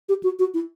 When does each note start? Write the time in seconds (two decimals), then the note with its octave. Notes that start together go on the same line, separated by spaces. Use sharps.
0.09 G4
0.23 F#4
0.39 F#4
0.54 E4